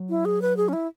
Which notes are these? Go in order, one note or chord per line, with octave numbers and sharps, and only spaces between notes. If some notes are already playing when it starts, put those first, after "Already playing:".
Already playing: F#3
E4
G#4
B4
G#4
C#4
E4